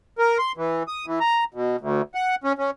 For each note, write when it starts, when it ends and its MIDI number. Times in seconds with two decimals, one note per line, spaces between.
0.19 0.38 70
0.39 0.52 84
0.57 0.83 52
0.88 1.06 87
1.06 1.19 52
1.20 1.44 82
1.54 1.76 47
1.80 2.02 38
2.15 2.35 78
2.44 2.53 61
2.58 2.71 61